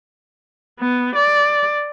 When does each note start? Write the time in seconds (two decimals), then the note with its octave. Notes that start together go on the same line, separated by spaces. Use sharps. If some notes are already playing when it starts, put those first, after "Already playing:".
0.79 B3
1.15 D5